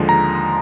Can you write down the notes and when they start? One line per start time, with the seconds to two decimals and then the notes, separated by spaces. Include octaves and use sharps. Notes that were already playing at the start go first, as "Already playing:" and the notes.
Already playing: D#2 D3 F3 G#3
0.09 A#5